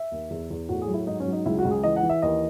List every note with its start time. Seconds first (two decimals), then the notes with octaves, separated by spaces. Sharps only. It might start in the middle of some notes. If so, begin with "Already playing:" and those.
Already playing: E5
0.12 D#2
0.30 E2
0.50 E2
0.69 A2 F#4
0.82 G#4
0.88 F#3
0.94 E4
1.07 G#2 D#4
1.20 C#4
1.26 F#3
1.33 D#4
1.46 C#2 E4
1.59 F#4
1.65 C#2
1.71 G#4
1.83 E3 D#5
1.96 F#5
2.03 E3
2.09 E5
2.22 D#2 D#5